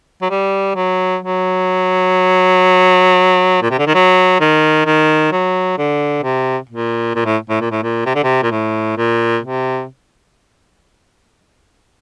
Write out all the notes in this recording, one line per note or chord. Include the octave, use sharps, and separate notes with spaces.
F#3
G3
F#3
F#3
A#2
C3
D3
D#3
F#3
D#3
D#3
F#3
D3
C3
A#2
A#2
A2
A2
A#2
A2
A#2
C3
D3
C3
A#2
A2
A#2
C3